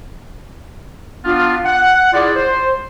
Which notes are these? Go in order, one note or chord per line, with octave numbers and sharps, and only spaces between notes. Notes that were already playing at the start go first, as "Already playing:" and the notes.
B3 D4 F4
F#5
E4 F4 G#4 D5
C5